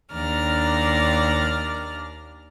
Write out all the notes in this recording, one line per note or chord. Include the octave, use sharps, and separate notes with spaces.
D#2 D4 D5 A#5 F6